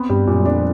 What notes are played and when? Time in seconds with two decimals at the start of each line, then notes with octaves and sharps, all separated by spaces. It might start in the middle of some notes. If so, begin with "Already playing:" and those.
Already playing: B3 C4
0.10 G2 G3
0.27 F#2 A#2
0.46 F2 D4